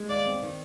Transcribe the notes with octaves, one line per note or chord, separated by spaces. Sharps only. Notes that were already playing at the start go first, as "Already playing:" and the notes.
Already playing: G#3
D#2 D5
C4
D#3